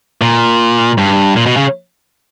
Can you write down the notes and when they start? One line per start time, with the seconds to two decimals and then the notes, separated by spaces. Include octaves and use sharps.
0.21 A#2
0.98 G2
1.36 A#2
1.46 B2
1.57 C#3